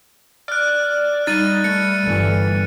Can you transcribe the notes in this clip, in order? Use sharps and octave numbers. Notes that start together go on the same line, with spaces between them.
D5 F6 F#6
G3 D#4 A6 D#7
A3 C#7
G1 A2 E3